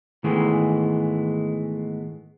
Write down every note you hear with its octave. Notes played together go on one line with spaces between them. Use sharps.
G#2 D#3 E3 G#3 A3 B3